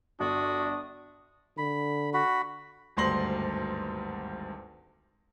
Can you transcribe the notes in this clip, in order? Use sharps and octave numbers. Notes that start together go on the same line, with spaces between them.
G1 D4 F#4 D#6
D3 B5
F#4 B5
G#1 D2 G2 C6 A#6 F#7